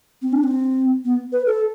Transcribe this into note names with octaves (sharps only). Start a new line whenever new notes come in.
C4
D4
C4
B3
B4
A4